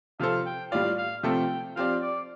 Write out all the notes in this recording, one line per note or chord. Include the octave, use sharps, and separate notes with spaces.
C3 F3 C4 A4 C5 F5
G5
A2 G3 F4 D5 F5
F5
C3 F3 A3 C4 A4 G5
F3 C4 G4 D5 F5
D5